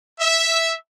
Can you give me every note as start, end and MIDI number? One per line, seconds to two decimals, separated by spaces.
0.19 0.73 76